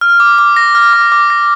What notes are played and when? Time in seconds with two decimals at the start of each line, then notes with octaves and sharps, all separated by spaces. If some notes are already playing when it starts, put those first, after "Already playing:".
0.01 F6
0.20 D6
0.38 D6
0.56 A#6
0.75 F6
0.93 D6
1.12 D6
1.30 A#6